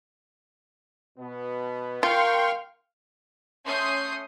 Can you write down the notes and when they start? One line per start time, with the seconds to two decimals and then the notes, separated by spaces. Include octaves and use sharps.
1.18 B2 B3
2.03 F4 A#4 F5 G5 C6 C#6
3.65 A3 C#4 C6 D#6 G6 C7